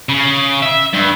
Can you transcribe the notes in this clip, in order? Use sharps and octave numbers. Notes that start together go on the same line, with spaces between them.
C#3
E5
G2